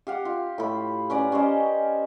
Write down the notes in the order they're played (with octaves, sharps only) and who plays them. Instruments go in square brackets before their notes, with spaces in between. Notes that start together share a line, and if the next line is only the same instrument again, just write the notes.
[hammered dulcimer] G4 F5 F#5
F4
A2 B5
C#4 B4 D5 A#5
C#4 G4 C5 D#5